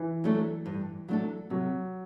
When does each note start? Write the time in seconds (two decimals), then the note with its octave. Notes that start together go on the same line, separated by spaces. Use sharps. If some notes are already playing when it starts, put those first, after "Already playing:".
Already playing: E3
0.24 F#3 A3 D4 A4
0.66 G2
1.08 F#3 A3 D4 A4
1.50 C3 F#3